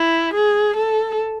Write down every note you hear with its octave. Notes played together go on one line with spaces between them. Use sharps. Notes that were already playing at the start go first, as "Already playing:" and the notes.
Already playing: E4
G#4
A4